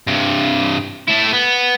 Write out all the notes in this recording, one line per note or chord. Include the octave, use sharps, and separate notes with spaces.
G2 C3
A3 E4
B3